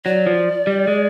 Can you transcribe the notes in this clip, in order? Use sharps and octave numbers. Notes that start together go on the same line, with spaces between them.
F#3 D5
F3
G3
G#3